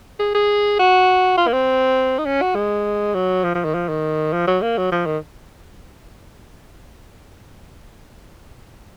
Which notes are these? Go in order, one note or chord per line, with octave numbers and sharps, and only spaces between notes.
G#4
G#4
F#4
F4
A#3
C4
D#4
C#4
F#4
G#3
F#3
F3
F3
D#3
F3
D#3
F3
F#3
A#3
F#3
F3
D#3